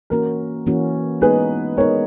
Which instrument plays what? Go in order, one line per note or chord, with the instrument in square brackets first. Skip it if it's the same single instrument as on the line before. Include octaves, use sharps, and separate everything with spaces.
[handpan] E3 A#3 C#4 F#4 [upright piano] A#4
[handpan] E3 A#3 C#4 F#4
[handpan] G#3 B3 D#4 [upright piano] G#4 B4
[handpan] G#3 B3 D#4 [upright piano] A#4 C#5